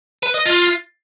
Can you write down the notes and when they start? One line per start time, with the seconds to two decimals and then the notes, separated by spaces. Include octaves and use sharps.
0.23 B4
0.34 D#5
0.46 F4